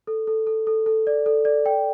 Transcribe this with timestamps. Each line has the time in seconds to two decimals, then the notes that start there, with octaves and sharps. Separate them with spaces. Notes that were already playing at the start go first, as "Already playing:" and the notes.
0.07 A4
0.27 A4
0.47 A4
0.67 A4
0.86 A4
1.07 D5
1.26 A4
1.45 D5
1.66 G5